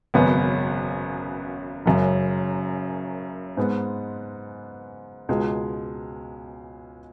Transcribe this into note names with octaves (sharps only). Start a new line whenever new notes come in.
G#1 F#2 C#3 B3
F#1 F#2 C#3
G#2 G#3 B3
C#2 B2 G#3